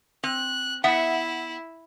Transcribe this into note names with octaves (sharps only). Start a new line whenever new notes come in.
C4 F#6
B3 E4 E5 F#5